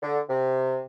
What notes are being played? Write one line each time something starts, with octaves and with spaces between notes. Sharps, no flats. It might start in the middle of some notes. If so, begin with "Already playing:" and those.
D3
C3